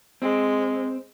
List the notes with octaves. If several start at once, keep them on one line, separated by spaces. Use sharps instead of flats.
G#3 C4